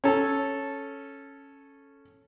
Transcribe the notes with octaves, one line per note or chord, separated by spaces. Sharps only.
C#4 A4